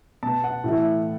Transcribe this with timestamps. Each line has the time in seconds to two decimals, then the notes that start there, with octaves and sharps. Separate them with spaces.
0.23 B2 B3 A5
0.44 F#5
0.64 A2 E3 A3